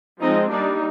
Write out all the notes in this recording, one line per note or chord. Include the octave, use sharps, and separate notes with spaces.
F3 G#3 C4 D#4 D#5
G3 A#3 D4 D#4 D5